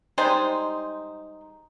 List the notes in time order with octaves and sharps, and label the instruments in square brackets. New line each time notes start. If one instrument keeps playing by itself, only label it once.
[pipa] G3 G#3 D#4 C5